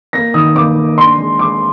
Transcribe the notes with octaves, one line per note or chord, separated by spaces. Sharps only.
A#3 A#6
D#3 D#6
A#3 D6
A#3
D4 C6
G#3
G#3 D6